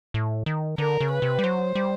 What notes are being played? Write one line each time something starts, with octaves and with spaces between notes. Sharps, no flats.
A2
D#3
D3 A#4
C#3
B4
C3
G3
F#3 C5
G3